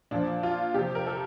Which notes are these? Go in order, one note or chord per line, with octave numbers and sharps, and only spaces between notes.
A#2 F3 D4
F4
C3 F3 G4
A#4
A4